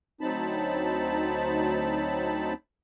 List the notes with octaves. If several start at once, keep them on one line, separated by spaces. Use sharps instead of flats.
D2 F#3 C4 D#4 A5 B5